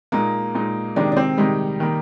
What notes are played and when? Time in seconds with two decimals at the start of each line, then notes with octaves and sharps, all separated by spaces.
0.12 A#2 G#3 A#3 D#4
0.55 A#2 G#3 D#4
0.96 C3 D#3 G#3 D4 D#4
1.12 D4
1.17 C4
1.38 C3 D#3 G3 G#3 D#4
1.80 D#3 A#3 D#4